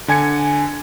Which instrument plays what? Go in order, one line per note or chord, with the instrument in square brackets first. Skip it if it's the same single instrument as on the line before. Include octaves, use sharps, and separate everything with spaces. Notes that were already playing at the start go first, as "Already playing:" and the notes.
[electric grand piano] D3 G#5 G#6 C#7